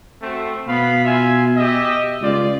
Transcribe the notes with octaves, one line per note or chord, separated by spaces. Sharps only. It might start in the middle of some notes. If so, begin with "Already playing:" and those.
A3 C4 F#4
B2 B3 F5 B5
F4 E5 G#5
G4 D#5 E5
C#2 F4 D5